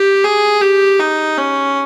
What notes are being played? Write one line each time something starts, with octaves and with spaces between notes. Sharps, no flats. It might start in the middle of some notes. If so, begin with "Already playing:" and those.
Already playing: G4
G#4
G4
D#4
C#4